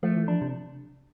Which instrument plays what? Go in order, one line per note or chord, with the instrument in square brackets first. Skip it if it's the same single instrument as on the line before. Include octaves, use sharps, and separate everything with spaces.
[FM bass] F3 [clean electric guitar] A3
[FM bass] E3
[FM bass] F3 [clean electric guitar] D4
[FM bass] C3